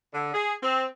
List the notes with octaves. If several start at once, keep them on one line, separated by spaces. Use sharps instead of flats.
D3
G#4
C4